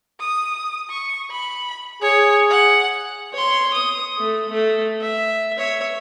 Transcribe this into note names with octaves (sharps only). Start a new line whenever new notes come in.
D#6
C#6
B5
G#4 C#5
F#5
C#5 C6
D#6
A3
A3
E5
C#5 E5